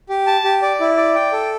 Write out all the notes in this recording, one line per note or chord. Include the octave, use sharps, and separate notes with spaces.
G4
A5
G4
D5
E4
D5
G5
A4